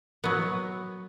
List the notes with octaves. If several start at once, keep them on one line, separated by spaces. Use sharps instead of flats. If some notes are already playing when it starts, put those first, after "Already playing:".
F#3 B3